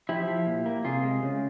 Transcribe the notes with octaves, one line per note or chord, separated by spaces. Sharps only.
F3 E4 G4
F3
A#2
A#3
C3 F4 G#4
G#3
C#3